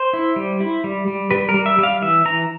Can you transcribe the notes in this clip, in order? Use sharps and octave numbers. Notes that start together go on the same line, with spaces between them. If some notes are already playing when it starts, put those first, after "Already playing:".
Already playing: C5
E4
G3
E4
G3
G3
G3 B4
A#4
G3
E5
G3 F5
E3 E5
E3 A#5